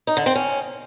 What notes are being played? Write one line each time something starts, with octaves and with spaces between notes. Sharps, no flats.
D#4
D3
C4
C#4